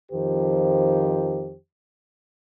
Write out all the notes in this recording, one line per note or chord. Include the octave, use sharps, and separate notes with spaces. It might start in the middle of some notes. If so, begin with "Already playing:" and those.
F2 D#3 F3 G4 C5